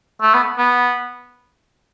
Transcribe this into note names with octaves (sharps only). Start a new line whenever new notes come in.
A3
B3
B3